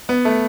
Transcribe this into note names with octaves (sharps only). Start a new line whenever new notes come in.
B3
A3